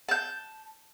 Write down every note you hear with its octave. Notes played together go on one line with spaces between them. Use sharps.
A5 G6